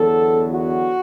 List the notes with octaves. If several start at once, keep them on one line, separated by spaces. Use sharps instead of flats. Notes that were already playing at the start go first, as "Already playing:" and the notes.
Already playing: E2 D3 F#3 B3 A4
F#4